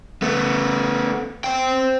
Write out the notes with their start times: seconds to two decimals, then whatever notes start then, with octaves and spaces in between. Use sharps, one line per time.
0.22 A3 B3
1.44 C5 G5